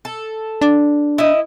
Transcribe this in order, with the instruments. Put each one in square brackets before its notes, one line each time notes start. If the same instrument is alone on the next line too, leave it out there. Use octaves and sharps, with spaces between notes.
[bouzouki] A4
[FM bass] D4
[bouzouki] E4 D#5